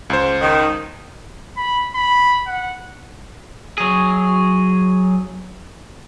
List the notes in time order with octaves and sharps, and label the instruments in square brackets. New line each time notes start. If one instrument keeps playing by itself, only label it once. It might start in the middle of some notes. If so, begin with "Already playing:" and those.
[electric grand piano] C#2 C5
[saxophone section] D#3
[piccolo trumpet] B5
B5
F#5
[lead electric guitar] F#3 G#4